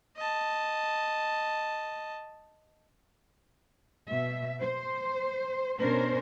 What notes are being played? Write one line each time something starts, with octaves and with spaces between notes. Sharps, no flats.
D#5 A5
B2 E5
C5
B2 C#4 D4 A#4 C5